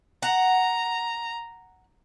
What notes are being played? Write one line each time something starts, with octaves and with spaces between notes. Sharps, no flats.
F#5 A#5